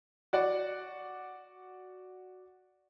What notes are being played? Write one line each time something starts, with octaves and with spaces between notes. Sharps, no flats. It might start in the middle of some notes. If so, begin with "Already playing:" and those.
F#4 D5 F#5